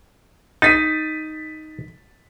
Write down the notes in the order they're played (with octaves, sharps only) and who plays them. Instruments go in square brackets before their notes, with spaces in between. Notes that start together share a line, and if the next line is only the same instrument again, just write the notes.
[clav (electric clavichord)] D#4 [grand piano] A6 B6 D#7